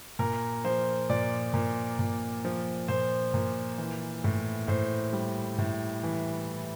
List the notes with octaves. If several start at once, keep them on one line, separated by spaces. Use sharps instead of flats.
A#2 A#4
F3 C5
A#2 D5
A#2
A#2
F3
A#2 C5
A#2
E3
A2
A2 C5
G3
A2
E3